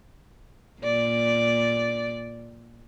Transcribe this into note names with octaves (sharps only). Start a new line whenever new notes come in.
A#2 D5